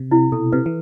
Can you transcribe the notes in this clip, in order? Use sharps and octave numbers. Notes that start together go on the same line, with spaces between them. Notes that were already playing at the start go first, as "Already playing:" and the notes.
Already playing: C3
C3 E4
B2 A4
C3 B4
E3